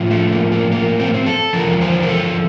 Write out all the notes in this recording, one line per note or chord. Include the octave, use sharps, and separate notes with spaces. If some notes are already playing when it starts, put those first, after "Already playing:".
Already playing: A2 F3
A3
A#3
A#3
A#3
C4
A#3
C4
A4
E2 D3 F3 A#4
C5
A#4
A4